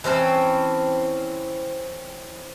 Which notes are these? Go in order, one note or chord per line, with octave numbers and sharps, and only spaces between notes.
E3 C4 C#4 A5